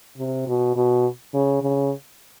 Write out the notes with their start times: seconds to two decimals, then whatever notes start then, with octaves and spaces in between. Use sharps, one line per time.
0.18 C3
0.47 B2
0.76 B2
1.34 C#3
1.62 C#3